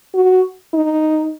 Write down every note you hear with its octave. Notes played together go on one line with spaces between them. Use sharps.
F#4
D#4